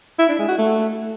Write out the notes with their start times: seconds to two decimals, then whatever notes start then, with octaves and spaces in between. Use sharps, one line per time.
0.19 E4
0.29 D4
0.38 G#3
0.48 F#4
0.58 A3